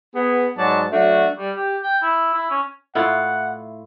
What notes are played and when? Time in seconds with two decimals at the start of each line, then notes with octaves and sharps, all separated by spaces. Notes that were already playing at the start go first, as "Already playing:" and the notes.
0.14 B3 G#4
0.57 G#2 F#3 D5 A5
0.91 F#3 A3 D4 F#4
1.38 G3
1.56 G4
1.83 G5
2.02 E4
2.33 E4
2.51 C#4
2.95 A2 E4 F4 F#5